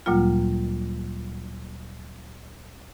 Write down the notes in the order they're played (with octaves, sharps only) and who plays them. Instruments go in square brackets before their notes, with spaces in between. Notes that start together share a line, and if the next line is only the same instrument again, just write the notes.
[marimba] D2 A#2 F#3 G3 A#3 F4